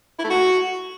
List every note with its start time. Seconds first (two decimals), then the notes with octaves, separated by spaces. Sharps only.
0.19 E4
0.24 A3
0.30 F#4